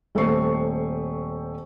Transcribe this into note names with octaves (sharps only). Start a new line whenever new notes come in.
D#1 A3 C4 G4 C#6 C7